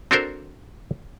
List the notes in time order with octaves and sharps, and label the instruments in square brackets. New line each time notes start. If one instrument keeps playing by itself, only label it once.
[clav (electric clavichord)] C4 D4 F#4 A4 A#4 C5